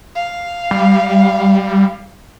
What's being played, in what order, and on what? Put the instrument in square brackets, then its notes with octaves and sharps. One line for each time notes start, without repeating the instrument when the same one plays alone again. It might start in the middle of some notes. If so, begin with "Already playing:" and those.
[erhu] F5
[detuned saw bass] G3